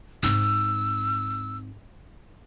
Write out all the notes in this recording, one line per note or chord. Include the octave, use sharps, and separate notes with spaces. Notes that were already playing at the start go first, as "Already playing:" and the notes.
G#2 C4 E6